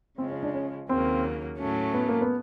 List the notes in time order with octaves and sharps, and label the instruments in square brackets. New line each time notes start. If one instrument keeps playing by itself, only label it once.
[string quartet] C#3 F3 G#3 [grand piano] C4
[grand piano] C#4
D4
C#4
[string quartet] D#2 C#3 F#3 A#3 [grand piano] C4
[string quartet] A2 F#3 A3 C#4
[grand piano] B3
A#3
B3